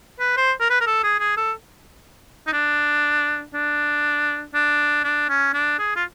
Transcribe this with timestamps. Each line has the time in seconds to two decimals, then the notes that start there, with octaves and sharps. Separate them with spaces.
0.19 B4
0.37 C5
0.60 A#4
0.70 B4
0.81 A#4
0.86 A4
1.04 G#4
1.20 G#4
1.37 A4
2.47 D#4
2.53 D4
3.54 D4
4.54 D4
5.04 D4
5.29 C#4
5.54 D4
5.79 G#4
5.96 F4